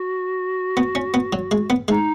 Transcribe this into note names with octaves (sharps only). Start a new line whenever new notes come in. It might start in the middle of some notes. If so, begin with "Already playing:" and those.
Already playing: F#4
B3
C#4
B3
F#3
G#3
B3
G#3 D#4